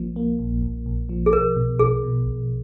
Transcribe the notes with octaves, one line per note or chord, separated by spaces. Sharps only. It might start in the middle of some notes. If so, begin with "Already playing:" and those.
Already playing: A#1 F3 A#3
A#3
A#1
A#1
A#1
F3
G#4
B1 A#4
B2
B1 G#4
B2
B1